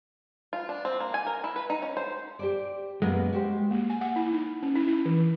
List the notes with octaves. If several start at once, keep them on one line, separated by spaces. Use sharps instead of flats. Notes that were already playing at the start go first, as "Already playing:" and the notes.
F4
D4
C4
A#3
G#5
A#4
E4
B4
D#4
C#4
C5
G4 C5 D5
F#2 G#3 A#3 B3
F#4 G4 C5
A#3
G#5
F#5
E4
D#4
C#4
E4
E4
E3